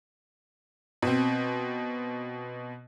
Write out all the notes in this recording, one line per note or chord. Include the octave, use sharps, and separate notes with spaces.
B2 C4